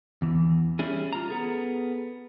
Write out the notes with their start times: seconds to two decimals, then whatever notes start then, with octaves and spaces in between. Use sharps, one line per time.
0.22 E2 E3
0.79 G3 C#4 E4 G#4
1.13 F4 A#5
1.29 B3 G#4 A4